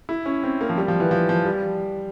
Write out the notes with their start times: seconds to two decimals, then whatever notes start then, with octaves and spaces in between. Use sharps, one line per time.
0.09 E4
0.26 C#4
0.43 C4
0.61 A#3
0.69 F3
0.77 G3
0.88 F3
1.00 E3
1.11 F3
1.29 F3
1.45 G3